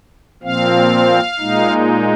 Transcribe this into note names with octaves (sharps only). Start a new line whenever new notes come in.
A#2 F3 C4 F5
A#2 G#3 D#4